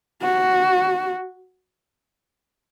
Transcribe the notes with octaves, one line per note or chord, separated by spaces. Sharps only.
F#4